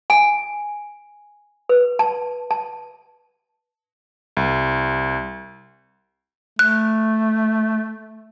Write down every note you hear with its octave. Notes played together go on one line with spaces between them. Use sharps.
G#5
B4
A5
A5
C2
A3 F#6